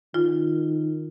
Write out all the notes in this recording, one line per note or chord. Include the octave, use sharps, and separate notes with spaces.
D#3 F4